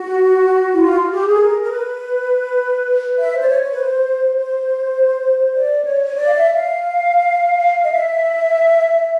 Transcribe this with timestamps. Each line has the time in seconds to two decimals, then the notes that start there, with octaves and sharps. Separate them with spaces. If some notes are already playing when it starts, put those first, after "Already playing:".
Already playing: F#4
0.74 E4
0.81 F4
0.97 F#4
1.11 G4
1.26 G#4
1.36 A4
1.40 A#4
1.62 A#4
1.70 B4
3.18 E5
3.33 C5
3.41 D5
3.47 C#5
3.62 C#5
3.72 B4
3.77 C5
4.36 C5
5.55 D5
5.85 C#5
6.04 C#5
6.14 D5
6.25 F5
6.34 E5
6.53 F5
7.83 D#5
7.91 E5